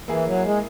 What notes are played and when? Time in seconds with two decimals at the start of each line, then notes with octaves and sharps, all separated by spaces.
0.08 E3 A#3 E4 G#4
0.26 F#3
0.45 G#3